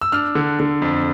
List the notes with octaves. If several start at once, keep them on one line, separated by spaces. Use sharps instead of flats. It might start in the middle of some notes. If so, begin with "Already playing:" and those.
E6
D4 F6
D3
D3
F2